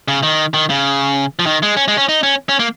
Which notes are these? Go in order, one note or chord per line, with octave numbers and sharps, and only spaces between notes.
C#3
D#3
D#3
C#3
F3
D#3
G#3
C#4
G#3
C#4
D#4
C#4
C#4
A#3